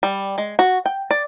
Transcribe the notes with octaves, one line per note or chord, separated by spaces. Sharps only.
G3
G#3
F#4
G5
D5